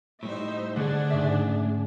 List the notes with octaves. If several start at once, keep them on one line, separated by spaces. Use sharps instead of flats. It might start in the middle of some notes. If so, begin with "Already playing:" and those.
A2 G3 D#4 C5 E5
D3 A3 D4 G#4 F#5
G#2 C#3 E5